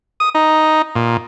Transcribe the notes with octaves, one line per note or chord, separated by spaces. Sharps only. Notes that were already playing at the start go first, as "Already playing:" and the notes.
D#6
D#4
A#2